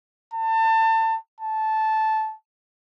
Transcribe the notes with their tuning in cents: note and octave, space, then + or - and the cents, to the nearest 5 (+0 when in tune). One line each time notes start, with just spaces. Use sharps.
A5 +30
A5 -10